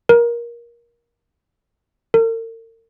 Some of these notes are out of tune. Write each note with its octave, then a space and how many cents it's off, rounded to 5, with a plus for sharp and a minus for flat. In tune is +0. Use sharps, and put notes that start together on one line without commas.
A#4 +20
A#4 -45